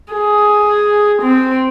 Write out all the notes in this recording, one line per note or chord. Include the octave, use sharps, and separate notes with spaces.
G#4
C4